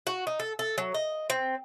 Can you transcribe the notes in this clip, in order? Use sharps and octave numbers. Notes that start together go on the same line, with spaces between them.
F#4
D#4
A4
A4
F#3
D#5
C4